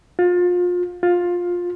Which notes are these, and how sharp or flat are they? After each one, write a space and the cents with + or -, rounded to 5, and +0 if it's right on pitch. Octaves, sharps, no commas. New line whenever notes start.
F4 +30
F4 +15